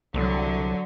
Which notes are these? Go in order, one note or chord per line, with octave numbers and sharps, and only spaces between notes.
C2 D3 F#3